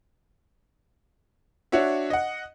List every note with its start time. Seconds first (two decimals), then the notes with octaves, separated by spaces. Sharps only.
1.72 D4 F#4 C#5 E5
2.10 D#5 F#5